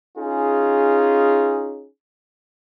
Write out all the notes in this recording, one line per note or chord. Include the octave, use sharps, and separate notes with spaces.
C#4 D#4 F4 G#4